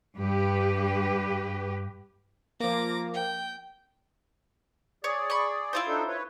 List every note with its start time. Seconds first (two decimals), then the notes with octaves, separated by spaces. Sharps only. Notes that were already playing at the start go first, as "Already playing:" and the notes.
0.17 G2 G4 B4
2.60 F3 A#3 D6 A#6
3.14 G5
5.04 G#4 C#5 D5
5.30 B5 C#6
5.73 E4 F4 C5
5.87 D4 D#4 A4
6.08 B4 C#5